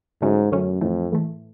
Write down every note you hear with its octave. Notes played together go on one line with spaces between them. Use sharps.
G#2 D3 F#3 A3 C#4
F#2 D3 F#3 A3 C#4
F2 A2 E3 A3
A2 E3 A3